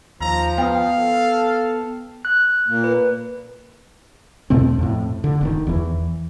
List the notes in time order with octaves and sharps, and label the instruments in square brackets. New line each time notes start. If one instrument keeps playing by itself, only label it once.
[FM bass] D#2 [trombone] F3 [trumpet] A#5
[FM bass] B3 [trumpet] F5 [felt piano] G5 D#6
[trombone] A4
[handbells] F#6
[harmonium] A#2 A#3
[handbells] B4
[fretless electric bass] E2 B2 A3 C4
F2 A2
D3
F1 B2 D#3
E2 E3